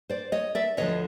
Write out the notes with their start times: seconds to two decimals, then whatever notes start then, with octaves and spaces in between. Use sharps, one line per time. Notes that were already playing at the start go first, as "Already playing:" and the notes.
0.09 C5 D5
0.32 C#5 D#5
0.55 D5 E5
0.77 D2 D3 F3 C#5 D#5